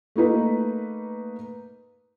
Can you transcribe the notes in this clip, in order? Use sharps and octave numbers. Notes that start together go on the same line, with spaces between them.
A3 A#3 D#4 B4